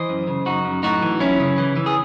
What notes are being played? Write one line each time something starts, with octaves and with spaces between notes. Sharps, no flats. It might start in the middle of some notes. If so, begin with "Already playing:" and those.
Already playing: E3 C5 D#5
F#2
C#3
F#2 D#4 F#4
F#2
A2 D#4 F#4
E3
F#2 C#4 E4
C#3
E3
E3
G#4